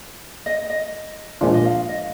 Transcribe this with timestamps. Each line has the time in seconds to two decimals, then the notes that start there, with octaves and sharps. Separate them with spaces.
0.46 D#5
0.70 D#5
1.41 A#2 F3 G#3 D4 F4 F5
1.54 D#5
1.65 F5
1.89 D#5